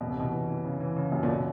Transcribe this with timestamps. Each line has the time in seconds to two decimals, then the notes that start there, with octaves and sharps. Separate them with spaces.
0.01 F#2 B2
0.10 C3
0.17 B2 E3
0.32 E3
0.49 E3
0.65 C#3
0.80 E3
0.96 C#3
1.12 F#2
1.23 A#2
1.29 B2